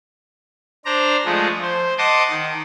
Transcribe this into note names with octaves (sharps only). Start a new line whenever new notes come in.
D4 C5 D5 A#5
F3 G#3 A3
C5
D#5 F#5 A5 C6 D6 D#6
D#3